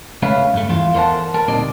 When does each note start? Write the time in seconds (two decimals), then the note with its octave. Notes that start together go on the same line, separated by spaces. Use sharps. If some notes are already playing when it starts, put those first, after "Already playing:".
0.22 C#2 A3 C#4 B4 E5 F5
0.54 G2 A3
0.69 E2 E3 F4
0.94 A4 A#4 C5 C#5 F#5 A5
1.34 B3 A#4 A5
1.48 D2 A#2 G3 C4 D#4 D5